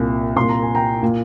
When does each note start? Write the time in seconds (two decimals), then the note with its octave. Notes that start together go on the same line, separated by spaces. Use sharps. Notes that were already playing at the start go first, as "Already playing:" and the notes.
Already playing: C2 A#2 G#5
0.36 C2 A#2 C6
0.49 A#5
0.62 G#5
0.75 G5 A#5
1.03 A#2